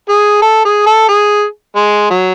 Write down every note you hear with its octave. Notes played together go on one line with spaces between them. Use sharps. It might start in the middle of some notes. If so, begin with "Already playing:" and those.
G#4
A4
G#4
A4
G#4
G#3
F#3